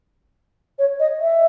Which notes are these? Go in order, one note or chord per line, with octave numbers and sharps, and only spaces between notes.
C#5
D#5
E5